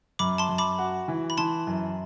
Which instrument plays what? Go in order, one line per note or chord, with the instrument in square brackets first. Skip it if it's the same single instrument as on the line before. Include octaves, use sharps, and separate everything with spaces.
[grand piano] F#2 [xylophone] B5 D6
[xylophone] A5 C6
[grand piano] F#2
[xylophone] B5 D6
[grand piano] F#4
E3
[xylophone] B5
[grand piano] E3 [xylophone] A5 C6
[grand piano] F#2